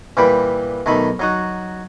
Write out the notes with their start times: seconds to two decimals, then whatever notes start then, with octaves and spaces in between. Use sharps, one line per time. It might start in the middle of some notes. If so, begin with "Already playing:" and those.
0.17 A#2 E3 G3 G5 B5
0.86 B1 D#3 A3 D#4 B5
1.19 F#3 D#4 F#4